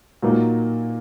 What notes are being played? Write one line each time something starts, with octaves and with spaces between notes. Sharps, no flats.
A#2 F#3 A#3 D#4